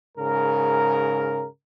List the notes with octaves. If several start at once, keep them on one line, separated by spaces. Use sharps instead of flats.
G#2 C#3 A#4